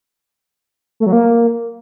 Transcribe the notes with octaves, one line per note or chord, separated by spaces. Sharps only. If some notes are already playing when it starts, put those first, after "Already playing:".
A3
F#3
A#3